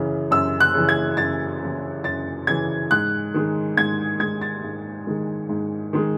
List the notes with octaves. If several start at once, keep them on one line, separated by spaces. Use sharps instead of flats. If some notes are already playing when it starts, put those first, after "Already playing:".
Already playing: F#2 C#3 E3
F#2 E6
F#6
C#3 E3
G#6
F#2 A6
C#3 E3
F#2 A6
C#3 E3 G#6
G#2 F#6
D#3 G#3
G#2 G#6
D#3 G#3 G#6
A6
G#2
D#3 G#3
G#2
D#3 G#3